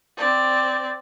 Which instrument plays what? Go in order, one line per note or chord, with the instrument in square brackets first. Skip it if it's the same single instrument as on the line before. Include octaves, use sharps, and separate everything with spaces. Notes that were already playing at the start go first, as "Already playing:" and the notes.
[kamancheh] C4 D5